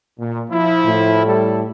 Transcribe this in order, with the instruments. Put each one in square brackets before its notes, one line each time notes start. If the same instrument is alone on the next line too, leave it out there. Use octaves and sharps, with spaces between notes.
[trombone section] A#2
F3 E4
[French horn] A2
[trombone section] G3 A4